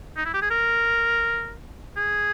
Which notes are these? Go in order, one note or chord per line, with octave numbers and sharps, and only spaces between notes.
D#4
E4
G4
G#4
A#4
G#4